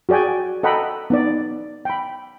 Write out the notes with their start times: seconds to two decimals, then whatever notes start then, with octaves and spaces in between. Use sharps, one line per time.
0.09 F#4 G#4 D5 G5 G#5
0.63 A4 D#5 F#5 G5 A#5 B5
1.10 B3 D#4 D5
1.85 G5 B5